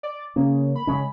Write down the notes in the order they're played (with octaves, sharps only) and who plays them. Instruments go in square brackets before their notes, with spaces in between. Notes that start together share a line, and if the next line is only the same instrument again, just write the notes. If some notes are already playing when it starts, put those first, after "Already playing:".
[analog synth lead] D5
[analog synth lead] C#3 [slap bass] A#3
[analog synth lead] B5
[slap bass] C#3 G#3 C#4